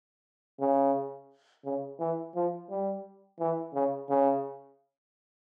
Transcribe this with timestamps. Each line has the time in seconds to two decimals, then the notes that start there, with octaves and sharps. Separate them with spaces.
0.61 C#3
1.65 C#3
2.00 E3
2.35 F3
2.70 G3
3.40 E3
3.74 C#3
4.10 C#3